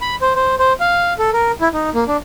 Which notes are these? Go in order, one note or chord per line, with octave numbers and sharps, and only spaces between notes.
B5
C5
C5
C5
F5
A4
A#4
E4
D#4
A#3
D4